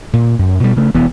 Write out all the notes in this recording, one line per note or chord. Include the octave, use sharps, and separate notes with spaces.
A#2
F#2
B2 G3
C#3 A3
E1 E3 B3